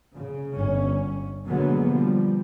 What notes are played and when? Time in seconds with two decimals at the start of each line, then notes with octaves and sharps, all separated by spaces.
0.15 C#3
0.55 G1 C#4
1.46 B2 D3 F#3 G#3 A#3 B3
1.87 B2 F3 G3